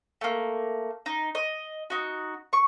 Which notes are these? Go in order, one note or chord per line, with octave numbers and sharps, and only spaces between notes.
A3 A#3
D#4
D#5
D#4 F#4
C#6